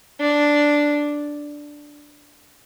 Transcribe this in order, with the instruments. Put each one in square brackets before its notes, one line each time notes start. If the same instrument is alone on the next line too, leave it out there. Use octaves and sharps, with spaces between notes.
[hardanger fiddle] D4